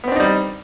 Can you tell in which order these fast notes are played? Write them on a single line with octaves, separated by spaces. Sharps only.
B3 C4 D4 D#4 G3